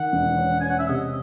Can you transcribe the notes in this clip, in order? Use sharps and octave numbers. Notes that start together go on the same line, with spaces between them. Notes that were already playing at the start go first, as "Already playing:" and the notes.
Already playing: D#3 F#5
E1
C#4
C#4 G#5
F#5
E5
C3 D#5